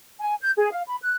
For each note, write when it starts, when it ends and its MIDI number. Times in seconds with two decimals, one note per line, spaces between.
0.21 0.34 80
0.41 0.51 91
0.57 0.68 68
0.71 0.81 77
0.87 0.96 83
1.02 1.16 90